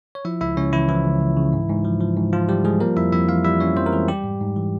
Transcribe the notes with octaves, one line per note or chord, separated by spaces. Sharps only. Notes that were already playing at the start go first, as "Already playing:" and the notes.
C#5
F3 E4 E5
C#2 E4 E5
C#2 C#4 C#5
C#3 E3 E4
E3 F3 E4
C#2
C#2
C#3
G#2
G#2
F3
F3
G#2
G#2 F3 F4
F3 G3 G4
F3 G#3 G#4
G3 A#3 A#4
F2 E4 E5
F2 E4 E5
E3 F4 F5
G3 E4 E5
F2 C#4 C#5
F2 C4 C5
A#4
E3 G#3 G#4
G3 G4
G#2
G#2
E3